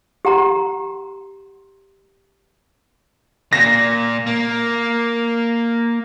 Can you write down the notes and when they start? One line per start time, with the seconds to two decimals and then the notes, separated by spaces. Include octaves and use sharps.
0.25 G4 F#5 A#5 C6
3.53 A#2 A#6
4.27 A#3